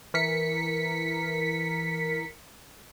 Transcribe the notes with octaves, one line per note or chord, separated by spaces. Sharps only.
E3 A#4 B6 C#7